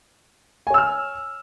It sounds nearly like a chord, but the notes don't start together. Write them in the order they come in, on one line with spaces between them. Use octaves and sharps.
G#5 C#5 E6 F6